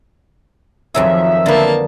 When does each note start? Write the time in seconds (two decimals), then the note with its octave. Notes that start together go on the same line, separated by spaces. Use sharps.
0.94 F2 D#3 F3 F#3 G#4 E5
1.46 D3 A#3 B3 A5